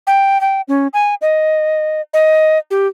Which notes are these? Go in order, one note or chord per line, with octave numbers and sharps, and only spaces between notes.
G5
G5
C#4
G#5
D#5
D#5
G4